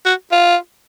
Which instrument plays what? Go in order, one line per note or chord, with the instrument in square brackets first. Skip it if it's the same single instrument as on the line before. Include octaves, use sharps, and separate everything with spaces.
[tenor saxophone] F#4
F4